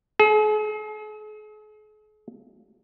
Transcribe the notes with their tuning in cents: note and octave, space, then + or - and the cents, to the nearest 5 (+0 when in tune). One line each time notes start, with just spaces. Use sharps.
G#4 +45